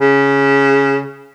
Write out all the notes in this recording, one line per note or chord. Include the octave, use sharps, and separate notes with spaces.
C#3